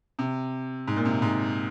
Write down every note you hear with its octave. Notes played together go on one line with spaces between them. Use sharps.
C3
G#2
A#2
C3
G#2